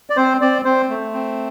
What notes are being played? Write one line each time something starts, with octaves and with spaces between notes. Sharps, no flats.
D5
C4 C5
C4 D5
C4 C5
A3
C4